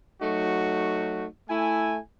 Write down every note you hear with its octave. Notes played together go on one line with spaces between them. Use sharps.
F#3 A3 D#4 F#4
A3 E4 G#5